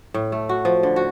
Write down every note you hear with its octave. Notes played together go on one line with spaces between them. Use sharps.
A2
A3
F#4
F3
D3
F#4